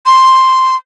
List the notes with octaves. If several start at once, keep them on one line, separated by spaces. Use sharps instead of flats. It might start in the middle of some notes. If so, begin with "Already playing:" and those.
C6